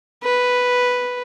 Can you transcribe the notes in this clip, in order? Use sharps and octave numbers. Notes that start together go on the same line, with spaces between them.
B4